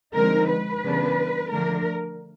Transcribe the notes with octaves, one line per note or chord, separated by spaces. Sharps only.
D3 F3 G#3 C4 D#4 A#4
B4
C#3 E3 G3 B3 D4
D3 F3 A3 D4 A#4